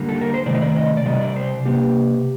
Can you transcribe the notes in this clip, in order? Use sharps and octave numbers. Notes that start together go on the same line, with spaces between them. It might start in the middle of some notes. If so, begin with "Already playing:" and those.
Already playing: D3 G3 A#3
A4
A#4
C5
C3 D#3 A3 D5
D#5
D5
D#5
D5
C3 G3 D#5
D5
C5
C3 D#3 A#3 G4